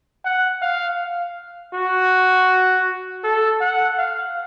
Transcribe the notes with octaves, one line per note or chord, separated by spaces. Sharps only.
F#5
F5
F#4
A4
F#5
F5